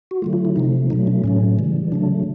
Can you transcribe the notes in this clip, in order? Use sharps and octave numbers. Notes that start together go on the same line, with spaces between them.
F#4
D3 F#3 A3 F4
F4
E4
C3 F3 A3 D#4
B2 F#3 A3 D#4
D4
A2 F#3 A3 C#4
C#3 E3 G3
C#3 F#3 A3 D4